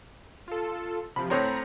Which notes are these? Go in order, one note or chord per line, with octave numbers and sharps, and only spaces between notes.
F4 A4
C3 F3 B5
A2 C4 C#5 A#5 B5